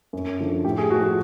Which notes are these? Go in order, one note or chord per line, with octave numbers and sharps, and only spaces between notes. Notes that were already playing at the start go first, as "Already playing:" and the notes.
F#2
D3 F3
A2 G4
G#4
F3 F#4
F#4